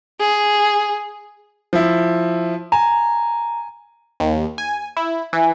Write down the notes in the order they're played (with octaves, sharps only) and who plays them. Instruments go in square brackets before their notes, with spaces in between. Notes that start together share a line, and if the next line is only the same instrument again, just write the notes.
[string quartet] G#4
[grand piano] F3 E4
[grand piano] G#5 [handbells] A#5
[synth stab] D#2
G#5
E4
E3